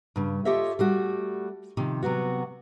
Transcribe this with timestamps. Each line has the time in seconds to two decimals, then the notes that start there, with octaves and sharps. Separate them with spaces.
0.16 G2 C#3
0.45 F4 G4 A4 C#5 D#5 E5
0.79 G3 A3 F#4
1.77 C3 D#3 F3
2.03 C3 F#3 B3 F#4